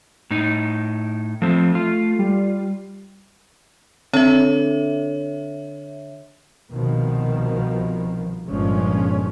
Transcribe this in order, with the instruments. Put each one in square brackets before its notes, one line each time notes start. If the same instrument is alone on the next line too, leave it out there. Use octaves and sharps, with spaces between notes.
[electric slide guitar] A2 D#4
[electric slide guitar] F3 C4 [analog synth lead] A3
[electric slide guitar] F4
[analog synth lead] G3
[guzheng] D3 D5 [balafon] C4 [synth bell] C#5 E5
[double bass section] C2 B2 D#3 F3
G1 G2 A#2 F3 G#3 C#4